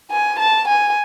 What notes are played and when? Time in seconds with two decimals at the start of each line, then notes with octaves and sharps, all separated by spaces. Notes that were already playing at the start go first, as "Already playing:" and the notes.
0.11 G#5
0.39 A5
0.68 G#5